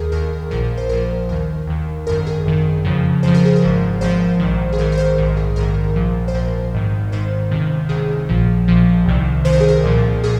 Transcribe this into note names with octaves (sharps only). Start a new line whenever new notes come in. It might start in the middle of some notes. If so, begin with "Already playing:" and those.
Already playing: D#2 D#3 G#4 A#4
D#2 D#3 A#4
A#1 A#2 F3 A#4
A#4
C5
A#1 A#2 F3 A#4
D#2 D#3 A#4
D#2 D#3
G#1 F#2 D#3 A#4
G#4
G#1 F#2 D#3
F2 C#3 F3
F2 C#3 F3 C5
A#4
G#4
A#4
G#1 G#2 F3
G#1 G#2 F3 C5
A#1 G#2 D#3
G#4
A#1 G#2 D#3 A#4
A#4
C5
A#1 G#2 D#3
G#4
A#1 G#2 D#3 A#4
A#1 A#2 F3
C5
A#1 A#2 F3 A#4
G#1 G#2 D#3
G#1 G#2 D#3 C5
C#2 C3 D#3
C#2 C3 D#3 G#4
A#1 A#2 F3
A#1 A#2 F3
C2 C3 D#3
C2 C3 D#3 C5
A#4
G#4
A#4
C2 A#2 F3
A#2 G#4